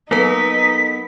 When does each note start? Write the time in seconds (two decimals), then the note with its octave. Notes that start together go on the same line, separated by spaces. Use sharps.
0.11 F#3 A#3 B3 D#4 A4 B4 B6